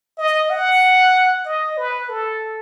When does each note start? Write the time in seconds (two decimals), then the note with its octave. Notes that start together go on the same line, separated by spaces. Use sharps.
0.18 D#5
0.50 F#5
1.46 D#5
1.77 B4
2.09 A4